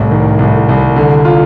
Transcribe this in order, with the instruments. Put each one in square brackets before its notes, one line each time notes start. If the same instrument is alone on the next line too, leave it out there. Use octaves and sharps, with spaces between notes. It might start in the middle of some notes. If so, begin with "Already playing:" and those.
Already playing: [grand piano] C2 [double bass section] A2
[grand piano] D#3
C2
C2
D3
F4